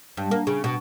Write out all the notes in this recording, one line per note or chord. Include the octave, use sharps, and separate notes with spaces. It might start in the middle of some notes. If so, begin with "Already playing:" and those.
G2
A#3
C#3
B2